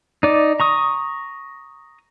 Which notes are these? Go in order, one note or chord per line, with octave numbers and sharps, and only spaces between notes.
D#4 D5
A#5 C#6 D#6